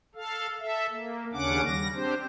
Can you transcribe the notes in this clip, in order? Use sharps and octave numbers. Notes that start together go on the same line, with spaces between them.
A4 F5
A4 E5
A#3
D#2 C#3 C#4 D4 F#5 D6
G3 A#6
C4 D4 G4 C5